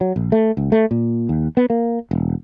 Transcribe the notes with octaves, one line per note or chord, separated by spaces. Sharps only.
F#3
A#1
A3
C#2
A3
A#2
D#2
B3
A#3
E1